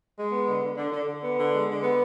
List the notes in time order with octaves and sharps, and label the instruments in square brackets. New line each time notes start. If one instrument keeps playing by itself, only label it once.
[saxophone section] G#3
B3
D3
D3
D3
D3
D3
B3
D3
G#3
D3
B3